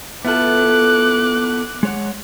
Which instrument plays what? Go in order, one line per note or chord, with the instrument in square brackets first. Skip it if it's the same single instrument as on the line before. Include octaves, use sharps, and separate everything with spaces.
[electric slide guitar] B3 [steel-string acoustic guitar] E4 F4 A4 [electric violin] D6 F#6
[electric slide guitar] G#3 C#5 F#5